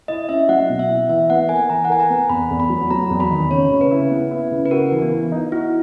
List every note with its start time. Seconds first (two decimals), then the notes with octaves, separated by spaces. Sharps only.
0.08 E4 D#5
0.29 C#4 E5
0.49 F#3 F#5
0.69 B2
0.79 E5
0.89 E4
1.09 E3 E5
1.30 B3 F#5
1.49 A#4 G#5
1.70 E3 A#5
1.85 F#5
1.90 A#4 G#5
2.00 A#5
2.10 B3
2.29 E2 B5
2.51 E2
2.60 B5
2.70 F#3
2.90 F#3 A#5
3.10 E2
3.20 B5
3.31 D#3
3.51 C#3 C#5
3.71 C#3
3.81 B4
3.91 E4
4.11 B3
4.31 E4
4.52 C#3
4.65 B4
4.71 F#4 A#4
4.92 E3
5.02 B3
5.12 E3
5.32 D#4
5.52 E4 F#4